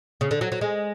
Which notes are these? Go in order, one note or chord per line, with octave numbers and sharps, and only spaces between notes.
C#3
D3
F#3
F#3
G#3